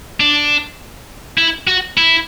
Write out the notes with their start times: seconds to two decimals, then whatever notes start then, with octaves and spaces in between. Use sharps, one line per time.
0.20 D4
1.38 E4
1.67 F#4
1.97 E4